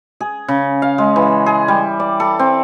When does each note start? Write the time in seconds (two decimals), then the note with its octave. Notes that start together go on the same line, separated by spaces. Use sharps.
0.21 G#4
0.48 C#3
0.82 F5
0.98 G#3
1.16 E3
1.46 G#4
1.68 G3
2.00 D5
2.20 A4
2.39 C4